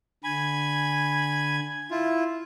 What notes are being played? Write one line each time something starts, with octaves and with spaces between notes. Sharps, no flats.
D3 G#5 B5 G#6
E4 F4